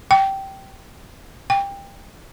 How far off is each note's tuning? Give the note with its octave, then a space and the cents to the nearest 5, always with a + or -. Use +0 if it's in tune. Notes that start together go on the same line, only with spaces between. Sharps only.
G5 -15
G5 +20